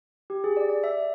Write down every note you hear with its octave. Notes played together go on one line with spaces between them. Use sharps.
G4
G#4
D5
D5
E5